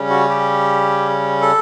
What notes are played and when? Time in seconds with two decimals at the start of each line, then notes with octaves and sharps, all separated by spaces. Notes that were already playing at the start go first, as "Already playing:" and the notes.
Already playing: C#3 G3 C#4
0.10 F#4
0.29 G4
1.41 A4